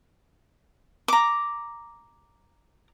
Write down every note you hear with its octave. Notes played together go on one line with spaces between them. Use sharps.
A#5 D6